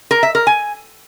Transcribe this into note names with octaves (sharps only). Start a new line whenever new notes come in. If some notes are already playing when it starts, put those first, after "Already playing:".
A#4
E5
A#4
G#5